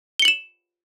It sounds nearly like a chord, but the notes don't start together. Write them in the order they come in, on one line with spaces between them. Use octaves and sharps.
G7 C#7 F#7 E7